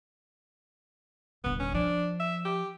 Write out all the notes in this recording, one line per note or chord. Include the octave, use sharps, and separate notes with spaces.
D#1 D3 B3
C#4
F3 D4
E5
G4